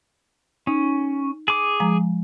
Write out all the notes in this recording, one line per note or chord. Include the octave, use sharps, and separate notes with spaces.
C#4 D#4
G#4 D6
F3 G#3 A#5